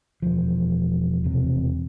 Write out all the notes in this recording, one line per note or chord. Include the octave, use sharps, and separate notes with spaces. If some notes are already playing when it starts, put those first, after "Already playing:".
E1 F3
E1 C3